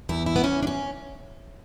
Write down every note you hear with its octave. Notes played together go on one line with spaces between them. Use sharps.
E2 E4
E4
B3
E2 C#4
D4
C#4